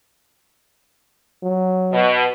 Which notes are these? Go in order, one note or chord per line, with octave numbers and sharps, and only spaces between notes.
F#3
B2